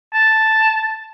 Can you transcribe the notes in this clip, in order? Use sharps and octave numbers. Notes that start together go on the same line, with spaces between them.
A5